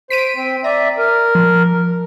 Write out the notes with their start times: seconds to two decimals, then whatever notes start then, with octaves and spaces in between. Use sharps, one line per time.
0.10 C5 B6 D7 D#7
0.36 C4
0.64 D5 E5 A#5
0.98 A#4
1.35 F3